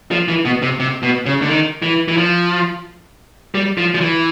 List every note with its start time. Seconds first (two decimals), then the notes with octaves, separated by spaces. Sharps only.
0.11 F3
0.28 E3
0.45 B2
0.62 C3
0.79 C3
1.03 B2
1.26 C#3
1.42 D3
1.49 D#3
1.82 E3
2.08 E3
2.17 F3
3.55 G3
3.78 F3
3.95 F3
4.00 E3